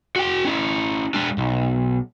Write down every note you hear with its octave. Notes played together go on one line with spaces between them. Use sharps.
F#4 G5
C#4 E4
G#3 D4
B1